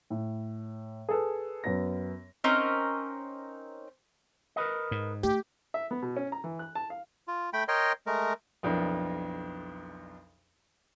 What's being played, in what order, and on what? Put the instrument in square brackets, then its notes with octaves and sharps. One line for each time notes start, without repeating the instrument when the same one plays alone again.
[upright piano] A2
G#4 A4 B4
F#2 B3 A#6
[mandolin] C4 C#4 D#4 A#4
[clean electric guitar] A#4 B4 D#5
[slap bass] G#2
[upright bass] A3 [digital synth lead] G4
[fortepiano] E5
B3
B2
C#4
A#5
E3
F#6
A5
F5
[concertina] F4
A3 G5 B5
A#4 C#5 D#5 G5 C6
G#3 A3 A#4
[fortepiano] B1 F2 D4 E4 A#4